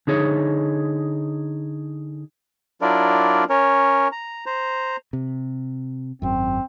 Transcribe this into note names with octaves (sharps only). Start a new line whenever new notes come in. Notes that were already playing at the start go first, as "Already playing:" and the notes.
D3 D#4 G#4 C#5
F#3 D4 E4 F4 A#4 D5
C#4 A#4 C#5
A#5
C5 A#5
C3
G#1 F#2 C4